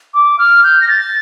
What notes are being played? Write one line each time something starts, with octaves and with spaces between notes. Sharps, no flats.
D6
F6
G6
A#6
A6